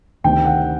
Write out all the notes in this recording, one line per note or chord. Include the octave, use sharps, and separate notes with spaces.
D2 C3 D#3 G5
F#5